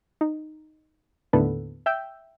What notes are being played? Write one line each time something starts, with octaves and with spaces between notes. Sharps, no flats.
D#4
D#2 A2 D3 B3 A4 B4
E5 G5 E6 G6